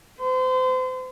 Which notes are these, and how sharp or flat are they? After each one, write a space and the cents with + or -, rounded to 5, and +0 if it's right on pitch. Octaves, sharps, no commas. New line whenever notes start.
C5 -35